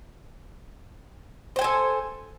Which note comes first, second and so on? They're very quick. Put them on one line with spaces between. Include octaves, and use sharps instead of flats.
C5 G5 G#5 A4